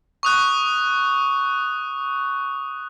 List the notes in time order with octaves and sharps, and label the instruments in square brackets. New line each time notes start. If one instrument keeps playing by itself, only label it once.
[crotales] C#6 D#6 F#6